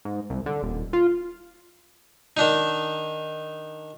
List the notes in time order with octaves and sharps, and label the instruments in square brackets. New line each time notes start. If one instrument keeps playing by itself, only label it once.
[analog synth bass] G#2
C2
D3
D#1
F4
[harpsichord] D#3 D4 D#4